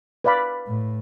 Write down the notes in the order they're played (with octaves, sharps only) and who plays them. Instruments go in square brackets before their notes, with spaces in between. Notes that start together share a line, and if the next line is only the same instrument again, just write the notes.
[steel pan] B4 D5 F5 B5
[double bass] A2